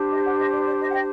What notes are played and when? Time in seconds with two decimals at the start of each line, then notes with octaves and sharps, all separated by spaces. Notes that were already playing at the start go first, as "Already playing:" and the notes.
Already playing: D4 G4 C5
0.11 D#5
0.24 D5 F#5
0.39 D#5
0.52 D5
0.65 D5
0.79 D#5
0.88 F#5
0.93 D#5 G5